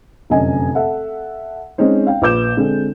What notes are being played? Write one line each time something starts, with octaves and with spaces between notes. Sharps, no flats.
F1 F#2 D3 D#5 G#5
A4 E5 F#5
G#3 C4 C#4 D#4 C5
F5 G5
A#1 B4 D6 G6 E7
D3 G#3 C4